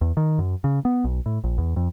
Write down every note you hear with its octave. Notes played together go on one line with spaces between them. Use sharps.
E2
D#3
F#2
C#3
B3
B1
A2
A#1
E2
F2